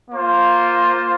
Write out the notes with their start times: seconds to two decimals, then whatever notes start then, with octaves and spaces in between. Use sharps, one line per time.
0.10 A#3 F4 C5